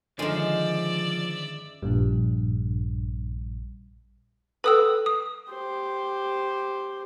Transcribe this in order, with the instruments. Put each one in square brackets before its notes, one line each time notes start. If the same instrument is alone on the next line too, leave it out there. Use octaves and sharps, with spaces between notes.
[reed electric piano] D3 D#3 C#4 [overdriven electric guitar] F3 [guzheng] G#3 A#4 [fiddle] D5 E5
[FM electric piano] A#1 G2
[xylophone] A4 D#6 E6 [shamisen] B4 G5
[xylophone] D#6
[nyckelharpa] G4 C5